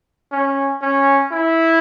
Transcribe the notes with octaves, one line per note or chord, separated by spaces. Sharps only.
C#4
C#4
E4